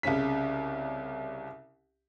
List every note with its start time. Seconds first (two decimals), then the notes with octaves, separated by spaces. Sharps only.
0.03 C2 C#3 C#4 B6